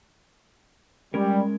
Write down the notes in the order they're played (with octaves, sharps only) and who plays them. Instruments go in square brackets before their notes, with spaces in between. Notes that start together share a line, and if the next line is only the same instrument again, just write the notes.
[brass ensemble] G3 [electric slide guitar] G#3 C#4 A#4